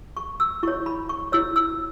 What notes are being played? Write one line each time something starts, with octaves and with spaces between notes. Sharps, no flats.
C#6
E6
E4 C#5 C#6
B5
C#6
E4 C#5 E6
E6